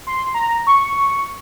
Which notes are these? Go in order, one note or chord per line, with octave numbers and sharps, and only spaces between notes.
C6
A#5
C#6